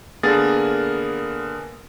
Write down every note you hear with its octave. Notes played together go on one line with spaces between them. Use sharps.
D3 A#3 B3 G#4 A#4 A6